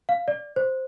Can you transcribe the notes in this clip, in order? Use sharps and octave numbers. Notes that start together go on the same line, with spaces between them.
F5
D5
C5